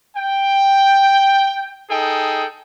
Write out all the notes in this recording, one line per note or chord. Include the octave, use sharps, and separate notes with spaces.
G5
D#4 G#4 A4 G5